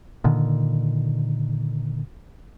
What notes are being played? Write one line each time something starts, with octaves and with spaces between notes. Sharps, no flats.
A#2 D3 D#3